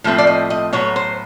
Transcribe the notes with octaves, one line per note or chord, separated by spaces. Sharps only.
A2 F3 A3 C4
D5
D#5
D#5
A2 F#3 B3 C#5
C5